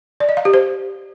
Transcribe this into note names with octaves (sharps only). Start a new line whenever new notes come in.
D5
D#5
F5
G4
C5